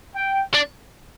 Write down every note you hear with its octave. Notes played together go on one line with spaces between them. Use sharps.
G5
D4